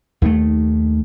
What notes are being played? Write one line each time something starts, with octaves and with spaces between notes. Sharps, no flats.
D#2 D#3 G#3 A3